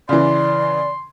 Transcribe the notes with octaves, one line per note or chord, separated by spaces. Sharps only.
C#3 E3 D5 C6